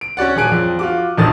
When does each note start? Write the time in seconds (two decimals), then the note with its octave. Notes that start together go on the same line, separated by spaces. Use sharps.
0.01 D7
0.17 C#4 F#4 D5 F#5
0.36 D#1 G#4 G#5 F#6 D7
0.51 F2
0.79 F4 F#4 D6
1.18 E1 A#1 D#3 A4 D#6 A6